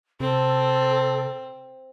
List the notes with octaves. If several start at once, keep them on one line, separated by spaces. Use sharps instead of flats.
C3 C4 A4